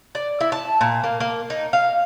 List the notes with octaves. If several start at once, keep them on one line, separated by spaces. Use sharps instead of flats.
D5
E4
A5
A#2
A#3
A#3
D#4
F5